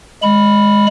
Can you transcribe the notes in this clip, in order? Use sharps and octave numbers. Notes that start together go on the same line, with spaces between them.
G#3 B5